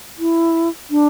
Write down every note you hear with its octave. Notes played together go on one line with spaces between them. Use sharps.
E4
D4